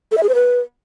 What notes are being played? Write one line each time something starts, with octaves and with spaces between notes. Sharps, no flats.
A4
E5
G#4
C5
B4